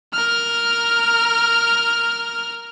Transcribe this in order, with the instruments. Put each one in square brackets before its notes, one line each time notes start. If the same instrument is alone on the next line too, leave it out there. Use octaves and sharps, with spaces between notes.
[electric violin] A#4 F6